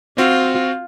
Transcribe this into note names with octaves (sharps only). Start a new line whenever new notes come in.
C4 F4 F#4